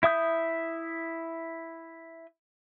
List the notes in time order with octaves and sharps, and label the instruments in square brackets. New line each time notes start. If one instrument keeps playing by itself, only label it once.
[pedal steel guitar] E4 E5 D#6 G6